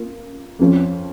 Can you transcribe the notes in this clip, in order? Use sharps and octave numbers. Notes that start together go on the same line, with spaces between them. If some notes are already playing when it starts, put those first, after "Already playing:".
Already playing: A#3 F4
F2 F3 C#4